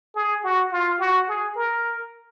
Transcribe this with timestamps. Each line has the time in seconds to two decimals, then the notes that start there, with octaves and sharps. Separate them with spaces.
0.15 G#4
0.44 F#4
0.72 F4
1.00 F#4
1.29 G#4
1.56 A#4